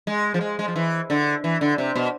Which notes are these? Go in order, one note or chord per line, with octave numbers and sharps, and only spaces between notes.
G#3
F3
G#3
G#3
F3
E3
D3
E3
D3
C3
B2